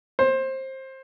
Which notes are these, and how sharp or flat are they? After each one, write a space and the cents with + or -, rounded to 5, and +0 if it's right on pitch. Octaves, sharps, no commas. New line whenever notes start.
C5 +20